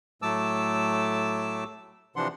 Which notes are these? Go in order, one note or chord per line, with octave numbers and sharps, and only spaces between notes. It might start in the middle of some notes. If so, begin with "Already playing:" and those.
A2 F#3 A3 A5 D6 E6
C3 E3 F3 D4 F#5 C6